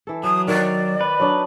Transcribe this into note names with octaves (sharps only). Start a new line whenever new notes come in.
E3 A4
F#3 D#6
D#3 C#5 D5 F5
B4
F#3 D4 D#5